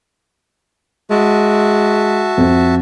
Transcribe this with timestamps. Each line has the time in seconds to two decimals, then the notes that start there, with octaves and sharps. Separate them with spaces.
1.11 G#3 F#4 E5 A5
2.38 F2